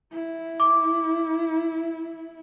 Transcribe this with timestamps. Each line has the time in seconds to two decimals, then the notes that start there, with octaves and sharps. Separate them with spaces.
0.12 E4
0.60 D6